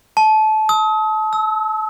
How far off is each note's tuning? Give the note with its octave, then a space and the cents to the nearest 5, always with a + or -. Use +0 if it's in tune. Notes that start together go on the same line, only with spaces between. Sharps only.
A5 -25
D#6 +40
E6 -30